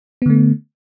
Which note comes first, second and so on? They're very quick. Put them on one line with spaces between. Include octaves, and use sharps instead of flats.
B3 D3 A3